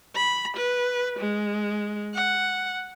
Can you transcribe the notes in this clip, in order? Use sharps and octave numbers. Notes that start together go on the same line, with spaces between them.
B5
B4
G#3
F#5